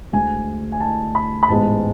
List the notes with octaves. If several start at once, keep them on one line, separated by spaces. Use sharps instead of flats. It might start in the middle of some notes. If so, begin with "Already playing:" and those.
D2 D3 G#3 G#5
G#5
A5
B5
B5
A1 G#2 G#3 B3 A5